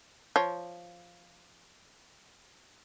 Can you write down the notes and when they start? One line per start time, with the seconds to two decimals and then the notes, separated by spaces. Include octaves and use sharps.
0.36 F3 C#5